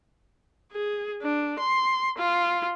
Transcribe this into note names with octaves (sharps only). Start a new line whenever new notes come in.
G#4
D4
C6
F4